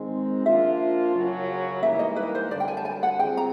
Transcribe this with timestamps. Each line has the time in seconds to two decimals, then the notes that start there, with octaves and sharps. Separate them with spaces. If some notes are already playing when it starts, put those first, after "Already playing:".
Already playing: D#3 G#3 C4
0.45 F3 A#3 D4 F4 E5
1.14 F#2 C#3 F#3
1.83 G#2 E3 G3 A#3 E5
1.99 D#5
2.16 B4
2.35 C5
2.51 F#2 D3 G3 D5
2.60 G5
2.68 G#5
2.77 A5
2.85 G#5
3.03 F#5
3.19 G3 C4 F4 G#4 G5
3.37 A#5